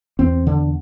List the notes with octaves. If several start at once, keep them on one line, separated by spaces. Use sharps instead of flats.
E2 C4
D3